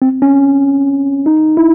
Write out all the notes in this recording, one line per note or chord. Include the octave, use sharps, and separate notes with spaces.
C4
C#4
D#4
E4